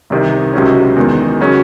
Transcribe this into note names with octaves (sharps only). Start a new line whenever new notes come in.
C2 C3 D#3
C#2 C3 F#3 C#4
E2 D#3 G#3
C#3 F#3 C#4